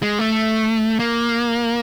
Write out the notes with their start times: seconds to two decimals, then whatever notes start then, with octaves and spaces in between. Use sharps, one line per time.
0.03 G#3
0.19 A3
1.00 A#3